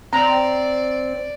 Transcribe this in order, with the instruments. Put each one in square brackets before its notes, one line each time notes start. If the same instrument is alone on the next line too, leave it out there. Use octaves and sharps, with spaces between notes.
[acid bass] C4 [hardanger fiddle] D5 [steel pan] A#5